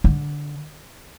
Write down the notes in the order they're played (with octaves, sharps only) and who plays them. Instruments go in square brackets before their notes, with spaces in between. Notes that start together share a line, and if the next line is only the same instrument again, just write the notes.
[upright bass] D3